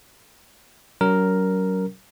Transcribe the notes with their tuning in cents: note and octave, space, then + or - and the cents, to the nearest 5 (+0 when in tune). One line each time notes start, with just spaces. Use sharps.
F#3 +25 C#4 +40 A#4 +0